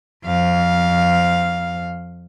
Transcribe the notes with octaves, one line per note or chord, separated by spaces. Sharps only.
F2 F5